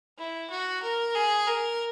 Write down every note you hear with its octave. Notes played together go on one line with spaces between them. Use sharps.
E4
F#4
A#4
G#4
A#4